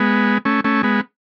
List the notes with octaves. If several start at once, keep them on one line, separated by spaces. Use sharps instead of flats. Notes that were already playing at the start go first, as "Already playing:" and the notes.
Already playing: G#3 B3
A3 C#4
A3 C#4
G#3 B3